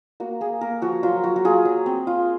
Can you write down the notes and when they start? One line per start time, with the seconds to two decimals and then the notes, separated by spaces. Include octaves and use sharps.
0.20 A#3 F#4
0.41 A#3 G#4
0.61 A#3 A#4
0.82 F3 F#4
1.03 F#3 F4
1.23 F#3 F#4
1.36 F#4
1.45 F4 G#4
1.65 F#3
1.86 C4
2.07 F4